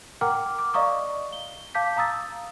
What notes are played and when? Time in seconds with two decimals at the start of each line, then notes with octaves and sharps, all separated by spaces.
0.21 A#4 F#5 G5 A#5 D6 F6
0.59 D6
0.74 D5 D#5 F5 A#5 C#6 D#6
1.33 G7
1.75 F5 A5 D6 G6 B6
1.96 F5 A#5 D#6 E6 A6